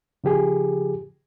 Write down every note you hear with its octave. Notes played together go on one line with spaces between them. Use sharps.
C#3 F3 G4 G#4